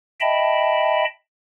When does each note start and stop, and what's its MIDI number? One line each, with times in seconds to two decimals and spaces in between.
0.21 1.05 75
0.21 1.05 76
0.21 1.05 79
0.21 1.05 81
0.21 1.05 83